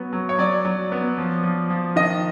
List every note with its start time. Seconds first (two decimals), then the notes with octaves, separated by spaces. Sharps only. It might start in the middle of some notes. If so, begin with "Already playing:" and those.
Already playing: F#3 B3
0.13 F#3
0.29 C#5
0.39 F#3 D5
0.65 F#3
0.92 B3
1.18 F3
1.44 F3
1.70 F3
1.96 D#3 D#5